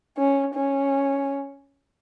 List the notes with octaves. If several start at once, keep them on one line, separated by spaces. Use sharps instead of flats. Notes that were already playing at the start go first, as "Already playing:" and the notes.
C#4
C#4